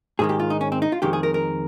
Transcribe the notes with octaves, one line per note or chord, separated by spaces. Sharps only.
G#2 D#3 G#3 G#4
G4
F4
D#4
C#4
C4
D#4
F4
F2 D#3 G#3 G4
G#4
A#4
A#4